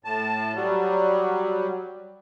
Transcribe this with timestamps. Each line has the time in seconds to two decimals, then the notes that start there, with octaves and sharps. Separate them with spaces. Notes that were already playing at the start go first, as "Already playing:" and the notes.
0.05 A2 A5
0.55 F#3 G3